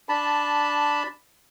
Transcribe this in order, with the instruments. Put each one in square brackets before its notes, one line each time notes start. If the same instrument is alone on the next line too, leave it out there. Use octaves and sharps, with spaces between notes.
[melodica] D4 A5 B5